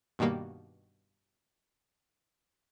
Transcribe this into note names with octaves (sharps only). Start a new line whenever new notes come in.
G2 B2 D#3 G3 A#3